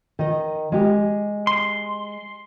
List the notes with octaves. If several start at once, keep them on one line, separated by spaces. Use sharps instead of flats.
D#3 D#5
G#3 G4
C6